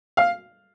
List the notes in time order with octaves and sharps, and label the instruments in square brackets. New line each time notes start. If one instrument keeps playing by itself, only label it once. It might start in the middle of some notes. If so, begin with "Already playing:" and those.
[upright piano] F5